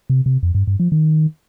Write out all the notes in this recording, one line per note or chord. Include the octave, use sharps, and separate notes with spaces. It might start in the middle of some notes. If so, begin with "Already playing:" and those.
C3
C3
F2
G2
G2
F3
D#3